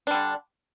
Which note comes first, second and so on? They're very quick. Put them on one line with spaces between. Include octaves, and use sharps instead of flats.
D4 G3 D3